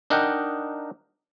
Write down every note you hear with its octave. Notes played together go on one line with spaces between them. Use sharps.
D4 D#4 A#4 D#5 F#5 G5